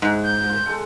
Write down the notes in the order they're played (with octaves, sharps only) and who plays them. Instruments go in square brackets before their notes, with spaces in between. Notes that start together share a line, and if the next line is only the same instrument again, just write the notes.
[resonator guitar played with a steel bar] G#2 [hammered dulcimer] G#4
[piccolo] G6
[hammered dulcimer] F4
G#3 A4 F#5